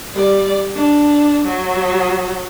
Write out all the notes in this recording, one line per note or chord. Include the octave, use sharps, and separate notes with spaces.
G3 D5
D4
F#3